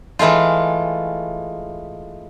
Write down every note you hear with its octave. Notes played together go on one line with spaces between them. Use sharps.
E3 G#3 A3 F4